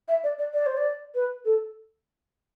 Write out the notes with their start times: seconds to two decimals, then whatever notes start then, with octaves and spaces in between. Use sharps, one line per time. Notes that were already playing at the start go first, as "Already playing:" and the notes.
0.08 E5
0.24 D5
0.39 D5
0.53 D5
0.66 C5
0.77 D5
1.15 B4
1.45 A4